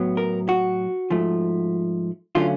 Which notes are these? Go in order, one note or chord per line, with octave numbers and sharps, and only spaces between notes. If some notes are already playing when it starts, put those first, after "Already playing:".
Already playing: A2 F#3 B3
A#4
F#4
G#2 F3 A3
D3 F#3 A3 C#4 F4